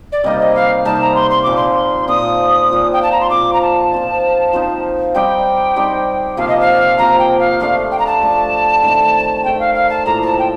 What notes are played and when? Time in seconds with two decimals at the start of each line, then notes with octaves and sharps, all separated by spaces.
0.12 D5
0.24 C3 G3 A#3 D#4 D#5
0.40 D#5
0.55 F5
0.85 C3 G3 A#3 D#4 A5
1.01 A#5
1.15 C6
1.30 C6
1.43 A#2 F3 C4 D6
1.56 C6
2.08 A#2 F3 C4 D#6
2.69 A#2 F3 C4
2.92 G5
3.02 A5
3.12 A#5
3.21 C6
3.30 A#2 F3 C4 D6
3.53 A#5
3.62 A5
3.91 F3 C4 D#4
4.53 F3 C4 D#4
5.14 G3 C4 D#4 G4 G5
5.76 G3 C4 D#4 G4
6.37 C3 F3 A#3 F5
6.48 D#5
6.60 F5
6.98 C3 F3 A#3 A#5
7.19 G5
7.39 F5
7.59 F3 A3 D4 F5
7.91 G5
7.99 A#5
8.06 A5
8.21 F3 A3 D4
8.82 D#3 A3 C4
9.44 D#3 A3 C4 G5
9.59 F5
9.74 F5
9.90 A5
10.06 A2 F3 A#3 A#5
10.22 A#5
10.26 A5
10.38 G5